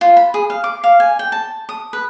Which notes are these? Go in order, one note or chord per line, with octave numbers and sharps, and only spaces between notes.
F4
B5
G#4
F5
D6
F5
G#5
G5
A5
D#6
B4